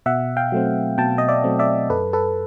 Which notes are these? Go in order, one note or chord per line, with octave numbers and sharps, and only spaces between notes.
B2 E5 F#5
F5 G5
F#3 A3 C4
B2 G5 A5
D#5
D5 E5
F#3 A3 C4
D5 E5
F#2 A4 B4
A4 B4